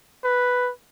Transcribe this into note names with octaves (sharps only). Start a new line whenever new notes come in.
B4